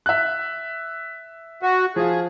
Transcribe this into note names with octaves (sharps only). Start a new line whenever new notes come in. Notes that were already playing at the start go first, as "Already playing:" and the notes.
E5 F#6
F#4
F3 F4 G#4